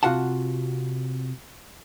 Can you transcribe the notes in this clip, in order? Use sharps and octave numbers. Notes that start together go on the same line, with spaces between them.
C3 F#3 F4 F#4 F#5 A5